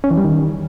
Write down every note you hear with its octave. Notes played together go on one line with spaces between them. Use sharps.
C#4
E3
G3
D#3